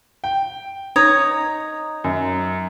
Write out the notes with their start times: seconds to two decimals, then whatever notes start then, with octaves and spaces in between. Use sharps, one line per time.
0.24 G5
0.96 D#4 C#5 A#5 D#6
2.04 F#2